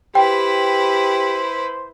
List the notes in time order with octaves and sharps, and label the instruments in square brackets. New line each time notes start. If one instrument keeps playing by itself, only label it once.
[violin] E4 B4 [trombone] G4 [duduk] C5 [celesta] G5